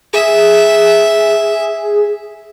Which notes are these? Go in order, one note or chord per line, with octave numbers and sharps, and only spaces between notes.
G#4 E5